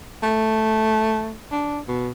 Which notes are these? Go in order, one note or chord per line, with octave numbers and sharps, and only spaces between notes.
A3
D4
B2